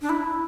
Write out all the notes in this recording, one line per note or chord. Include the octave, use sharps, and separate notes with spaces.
D4
E4